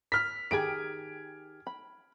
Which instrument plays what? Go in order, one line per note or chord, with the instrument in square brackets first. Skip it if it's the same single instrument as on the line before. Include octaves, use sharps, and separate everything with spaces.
[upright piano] F6 B6
[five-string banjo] D#3 G4 G#4 [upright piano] G#6 D7
[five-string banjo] B5